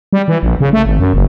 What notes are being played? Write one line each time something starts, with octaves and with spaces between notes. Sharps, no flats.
G3
E3
A#1
C#3
A3
G#1
F#2
F#1